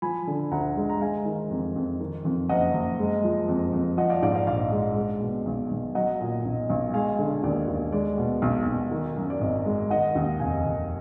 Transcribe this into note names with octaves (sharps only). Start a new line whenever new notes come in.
F3 G#5 B5
D3
D2 F#5 A#5
G#3
A#5
G#3 F5 G#5
D#3
F2
F2
D#3
F2
F#1 D#5 F#5
F#1
G#3
F3
F2
F2
F3 D#5 F#5
D5 F5
G#2 D5 F5
D5 F5
A#1 D5 F5
G#3
G#3
B2
B1
B1
F#3 D#5 F#5
A#2
B1
B1
G#3 F5 G#5
D3
D#2 D5
D#2
G#3 D5
B2
B1
B1
D#3
F#2
D5
G#1 D#5
G#3
D#3 D#5 F#5
D#2
F1 F5 G#5
F1